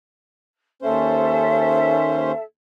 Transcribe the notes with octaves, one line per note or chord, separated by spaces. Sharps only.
D#2 C#4 A4 C5 E5